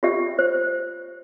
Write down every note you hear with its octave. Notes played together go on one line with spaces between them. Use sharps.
F4 G4 E5
C5